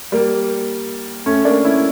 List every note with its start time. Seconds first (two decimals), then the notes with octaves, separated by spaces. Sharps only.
0.12 G3 A#3
1.26 A3 C#4
1.45 A#3 D4
1.65 C#4 E4